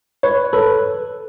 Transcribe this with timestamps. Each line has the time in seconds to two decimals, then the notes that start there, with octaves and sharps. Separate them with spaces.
0.23 B4 C#5
0.53 A4 B4